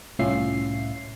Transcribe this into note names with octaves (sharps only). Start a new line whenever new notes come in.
C2 A2 C#4 F4 E5 C7